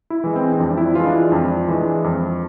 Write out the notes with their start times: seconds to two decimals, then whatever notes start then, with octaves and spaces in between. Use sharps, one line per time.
0.10 E4
0.24 E3 G#3
0.36 C4
0.52 C4
0.59 F2 D4
0.70 D4
0.78 E4
0.95 E3 G#3 F4
1.06 D4
1.14 E4
1.31 F2 D4
1.68 E3 G#3
2.04 F2